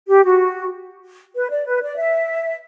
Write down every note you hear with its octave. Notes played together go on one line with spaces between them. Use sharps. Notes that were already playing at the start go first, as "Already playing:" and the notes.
G4
F#4
B4
D5
B4
D5
E5